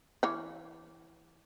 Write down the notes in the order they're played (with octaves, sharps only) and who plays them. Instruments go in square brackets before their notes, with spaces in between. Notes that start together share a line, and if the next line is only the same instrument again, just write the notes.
[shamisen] E3 C#5 F5